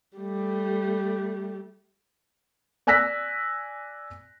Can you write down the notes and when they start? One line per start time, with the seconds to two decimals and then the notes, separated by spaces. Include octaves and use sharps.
0.18 G3 A3
2.87 D5 G#5 E6 F#6 A#6 B6